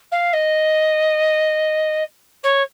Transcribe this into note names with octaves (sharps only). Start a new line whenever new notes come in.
F5
D#5
C#5